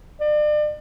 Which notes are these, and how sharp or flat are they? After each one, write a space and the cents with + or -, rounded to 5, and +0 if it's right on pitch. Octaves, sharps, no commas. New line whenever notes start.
D5 +35